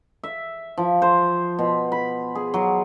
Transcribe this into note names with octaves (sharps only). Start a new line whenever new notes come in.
E5
F3
C5
B2
B5
G#4
F#3